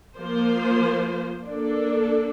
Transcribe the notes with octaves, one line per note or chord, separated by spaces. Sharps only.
F3 A#3 F4 C5
A#3 D4 A4